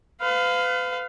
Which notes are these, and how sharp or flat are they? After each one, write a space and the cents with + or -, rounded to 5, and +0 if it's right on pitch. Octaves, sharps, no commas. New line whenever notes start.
B4 +40 F5 +0